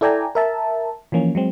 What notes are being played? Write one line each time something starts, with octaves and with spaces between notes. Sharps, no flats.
E4 A4 D5 G5 G#5 A#5
A#4 E5 A5
E3 F3 A#3 C#4
F#3 G#3 C4